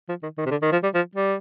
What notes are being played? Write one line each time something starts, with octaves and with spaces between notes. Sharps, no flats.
F3
D#3
D#3
C3
D3
D#3
F3
G3
F3
G3